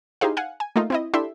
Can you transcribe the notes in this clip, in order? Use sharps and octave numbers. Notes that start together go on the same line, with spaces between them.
D#4 E4 G4 G#4 C5 F5
F5 F#5 G#5
G#5
A3 A#3 D#4 F4
C4 E4 D#5
D4 E4 G4 A4 E5 C6